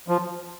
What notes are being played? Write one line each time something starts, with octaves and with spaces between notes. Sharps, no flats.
F3